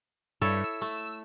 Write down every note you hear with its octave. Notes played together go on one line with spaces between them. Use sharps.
G2 E4 A4 C#5
E6
A3